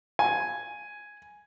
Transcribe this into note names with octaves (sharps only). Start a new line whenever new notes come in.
G#5